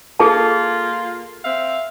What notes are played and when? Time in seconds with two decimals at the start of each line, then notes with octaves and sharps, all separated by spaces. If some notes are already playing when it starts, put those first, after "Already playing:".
0.20 A#3 F4 G#4 A4 A5
1.44 C4 E5 F5